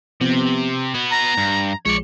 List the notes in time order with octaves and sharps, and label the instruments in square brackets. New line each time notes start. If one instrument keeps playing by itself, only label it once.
[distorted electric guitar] C3 [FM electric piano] F3 B3 C4
[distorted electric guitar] B3 F#4 [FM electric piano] G#6
[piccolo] A#5
[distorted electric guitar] G2
[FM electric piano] A#1 F3 G#3 [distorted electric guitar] C#5 D5 [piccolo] C#7